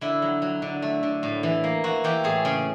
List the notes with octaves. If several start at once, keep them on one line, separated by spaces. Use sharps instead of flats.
D3 E4
F#3
F#3
D3
A3
D3
A2
E3
A#3
E3 F#4
E3 G4
A2 G#4
C#3